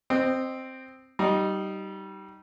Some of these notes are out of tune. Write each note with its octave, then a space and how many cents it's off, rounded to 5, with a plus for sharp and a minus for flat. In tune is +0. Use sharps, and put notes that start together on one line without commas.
C4 +0 D#5 -20
G3 -20 D#4 -5